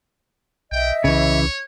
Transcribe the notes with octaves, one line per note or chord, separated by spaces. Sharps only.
B1 D#5 E5 G5
C2 C#3 E3 C#5